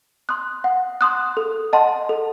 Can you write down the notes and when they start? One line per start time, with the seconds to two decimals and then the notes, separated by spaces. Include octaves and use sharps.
0.29 C6 D#6 F#6
0.64 F#5
1.01 C6 D#6 F#6
1.37 A4
1.73 D#5 F#5 A5 C6
2.09 A4